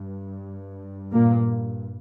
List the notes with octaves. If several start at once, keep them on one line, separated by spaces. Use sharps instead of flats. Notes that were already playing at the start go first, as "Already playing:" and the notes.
Already playing: G2
A#2 A#3